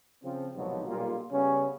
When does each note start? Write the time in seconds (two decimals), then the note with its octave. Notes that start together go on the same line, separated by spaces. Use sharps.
0.24 C#3 F3 C4
0.55 C2 G#2 B2 D#3 F3 F#3
0.88 B1 A#2 G3 A#3 F4
1.31 C#3 G3 B3 C#4